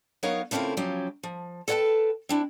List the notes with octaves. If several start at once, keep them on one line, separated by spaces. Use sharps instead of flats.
F#3 B3 D#4 A#4 C#5 F5
C#3 A3 A#3 C4 E4 F4
C#3 F3 F#3 C#4 G4
F3
A4 B4 C#5 F#5 G5 A5
C4 D4 E4